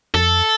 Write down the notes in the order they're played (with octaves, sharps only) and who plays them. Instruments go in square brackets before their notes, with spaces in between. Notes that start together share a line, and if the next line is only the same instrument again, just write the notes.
[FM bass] F2 [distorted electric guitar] A4